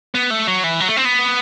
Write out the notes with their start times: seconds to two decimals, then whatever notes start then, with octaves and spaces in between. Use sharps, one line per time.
0.15 B3
0.31 A3
0.47 F#3
0.64 E3
0.80 F#3
0.89 A3
0.97 C4
1.05 B3